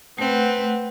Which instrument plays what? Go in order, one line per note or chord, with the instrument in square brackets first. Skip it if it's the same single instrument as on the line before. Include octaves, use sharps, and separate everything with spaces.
[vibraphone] A3 F#5 [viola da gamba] C4 B4